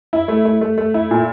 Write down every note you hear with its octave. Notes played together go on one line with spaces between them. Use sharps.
E4
A3
A3
A3
A3
E4
A#2